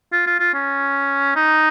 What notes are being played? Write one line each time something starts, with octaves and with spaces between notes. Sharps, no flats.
F4
F4
F4
C#4
D#4